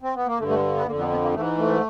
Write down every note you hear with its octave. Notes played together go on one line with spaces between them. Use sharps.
C4
B3
A#3
G2 D3 A3
A3
G#3
B3
F2 D3 A#3
B3
B3
A#3
G#2 E3 A3
A3